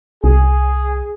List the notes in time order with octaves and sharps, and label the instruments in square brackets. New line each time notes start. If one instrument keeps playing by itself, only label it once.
[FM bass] C2 [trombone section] G#4